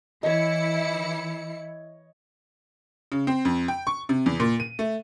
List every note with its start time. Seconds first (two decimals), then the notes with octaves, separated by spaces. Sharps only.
0.23 E3 E4 C#5 D#5 C#7
3.12 C#3
3.27 C4
3.45 F2
3.68 G5
3.87 C#6
4.09 C3
4.26 E2
4.40 A#2
4.60 D#7
4.79 A3